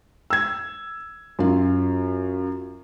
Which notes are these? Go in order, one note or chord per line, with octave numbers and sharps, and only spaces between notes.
E6 G#6
F#2 F4